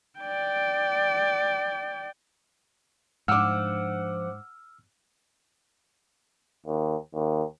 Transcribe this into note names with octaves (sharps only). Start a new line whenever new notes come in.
D5 G5
G#2 F3 D4 F#5 D6 E6 F6
D#2
D#2